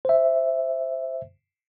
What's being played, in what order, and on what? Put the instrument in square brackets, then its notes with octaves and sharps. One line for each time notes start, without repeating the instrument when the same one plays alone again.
[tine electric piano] C5 E5